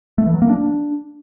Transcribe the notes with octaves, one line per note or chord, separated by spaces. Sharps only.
A3
E3
F#3
A#3
D4